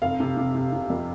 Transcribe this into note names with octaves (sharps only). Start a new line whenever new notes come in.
F1 F5
C3
C3
C3
C3
F2